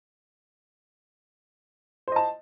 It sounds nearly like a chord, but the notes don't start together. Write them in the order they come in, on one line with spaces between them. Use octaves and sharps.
C5 D#5 A5